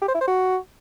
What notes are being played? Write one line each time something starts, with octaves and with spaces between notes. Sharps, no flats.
G4
C5
E4
C5
F#4